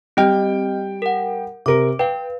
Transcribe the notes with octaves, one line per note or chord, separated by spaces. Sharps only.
G3 C4 D#5 G5 F6
A#4 F#5
C3 A#4 D6 D7
B4 F5 G5